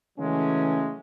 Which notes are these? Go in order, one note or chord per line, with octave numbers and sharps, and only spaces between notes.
C#3 E3 F#3 G#3 A3 C#4